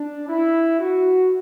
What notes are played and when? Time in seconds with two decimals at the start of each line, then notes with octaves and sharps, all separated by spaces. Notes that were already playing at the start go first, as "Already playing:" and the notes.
Already playing: D4
0.29 E4
0.80 F#4